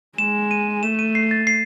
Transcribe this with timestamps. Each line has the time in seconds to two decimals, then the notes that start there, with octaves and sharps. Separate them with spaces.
0.18 G#3 E7
0.51 D#7
0.83 A3 E7
0.99 D#7
1.15 C7
1.31 A6
1.47 C7